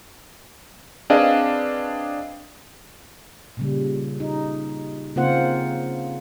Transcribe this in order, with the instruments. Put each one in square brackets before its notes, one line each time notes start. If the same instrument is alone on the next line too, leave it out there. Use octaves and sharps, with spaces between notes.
[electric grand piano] C4 D4 G#4 B4 D#5 F5
[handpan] A#2 C#3 G3
D#4
C#3 A#3 C4 F4 C5 F#5